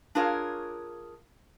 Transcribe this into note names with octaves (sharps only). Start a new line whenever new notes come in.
D4 F4 G#4 A#4 C#5 F5